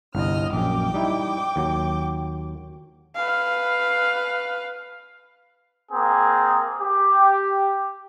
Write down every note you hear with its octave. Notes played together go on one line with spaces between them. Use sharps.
G1 C2 D#5 F6
A#1 F#2 G5 D6
G3 D#4 E4
D#2 F#3
B4 F5
A#3 C4 G#4
G4